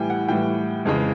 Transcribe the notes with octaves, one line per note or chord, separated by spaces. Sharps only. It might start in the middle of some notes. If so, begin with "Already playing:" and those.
Already playing: A2 E3 G3 G5 G#5
F#5
A2 E3 G3 G5
F2 C#3 E3 G#3